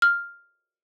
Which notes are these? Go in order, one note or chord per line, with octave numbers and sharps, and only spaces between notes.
F6